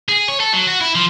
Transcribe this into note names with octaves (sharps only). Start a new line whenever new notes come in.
G#4
C#5
A4
F#3
F#4
E4
F3